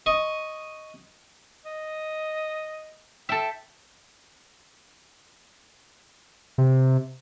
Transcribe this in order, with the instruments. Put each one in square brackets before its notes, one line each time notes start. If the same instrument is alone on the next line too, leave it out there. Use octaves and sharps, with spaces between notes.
[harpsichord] D#5 C#6
[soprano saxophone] D#5
[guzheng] A4 E5 [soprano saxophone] G5
[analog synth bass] C3